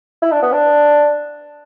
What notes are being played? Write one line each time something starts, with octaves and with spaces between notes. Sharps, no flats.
E4
D4
B3
D4